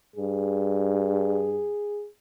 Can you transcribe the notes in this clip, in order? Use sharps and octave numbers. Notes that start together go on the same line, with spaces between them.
G2 G#4